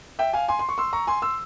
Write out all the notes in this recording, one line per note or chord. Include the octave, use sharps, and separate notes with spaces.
E5 G5
F5 G#5
G#5 C6
C6
C#6
C6 E6
A#5 C#6
G#5 C6
C6 E6